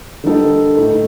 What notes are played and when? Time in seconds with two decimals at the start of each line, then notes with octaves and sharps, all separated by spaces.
0.24 D3 G3 A#3 D#4 A4
0.77 A2 A3 D#4